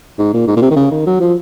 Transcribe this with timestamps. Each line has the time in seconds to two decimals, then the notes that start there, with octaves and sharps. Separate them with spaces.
0.18 G#2
0.33 A#2
0.47 G#2
0.56 A#2
0.61 C3
0.70 D#3
0.76 C#3
0.91 D#3
1.06 F#3
1.20 F3